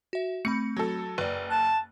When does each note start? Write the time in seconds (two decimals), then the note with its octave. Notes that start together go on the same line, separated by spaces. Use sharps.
0.13 F#4 E5
0.45 A3 C4 B5 C#7
0.76 F#3 A4
1.18 F#1 B4 D5
1.50 A5 F#6